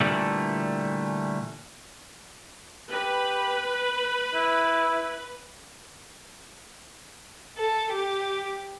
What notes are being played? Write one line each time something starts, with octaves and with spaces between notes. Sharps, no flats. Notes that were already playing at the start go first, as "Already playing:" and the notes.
A#2 D3 E3 G3 A3
G4 B4
E4
A4
G4